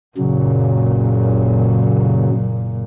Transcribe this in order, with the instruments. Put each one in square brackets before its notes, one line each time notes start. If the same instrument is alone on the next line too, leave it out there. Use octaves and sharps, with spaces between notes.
[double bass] F#1 A#2 [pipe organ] C#3 F#3